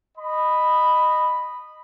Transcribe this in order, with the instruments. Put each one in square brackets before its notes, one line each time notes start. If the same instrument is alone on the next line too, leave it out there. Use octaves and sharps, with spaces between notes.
[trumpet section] D#5 B5